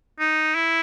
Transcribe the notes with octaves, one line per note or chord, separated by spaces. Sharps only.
D#4
E4